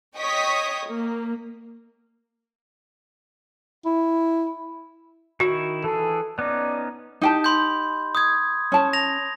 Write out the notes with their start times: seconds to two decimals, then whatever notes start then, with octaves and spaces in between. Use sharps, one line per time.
0.17 C#5 D#5 G5 C#6 D#6 B6
0.87 A#3
3.86 E4
5.40 D#3 E4 F#4 C#6
5.84 E3 G#4 A4
6.39 B3 C#4 D#4 D5
7.21 D#4 G4 A5
7.44 B5 C6 G6
8.15 D#6 G6 G#6
8.72 C#4 A5
8.93 A#6 F7